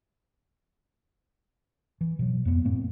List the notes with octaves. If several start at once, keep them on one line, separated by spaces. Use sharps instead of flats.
E3
B2 F#3
F2 A#3 B3
F#2 A2 A#3 C4